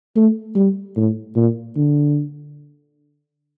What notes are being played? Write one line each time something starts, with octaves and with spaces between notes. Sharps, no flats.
A3
G3
A2
A#2
D3